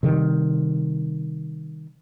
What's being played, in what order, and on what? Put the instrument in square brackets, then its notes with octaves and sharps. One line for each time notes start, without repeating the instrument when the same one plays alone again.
[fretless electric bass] C3 D#3 G3